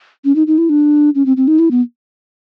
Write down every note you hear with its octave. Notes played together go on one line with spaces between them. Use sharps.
C#4
D#4
D#4
E4
D4
C#4
C4
C4
D#4
E4
B3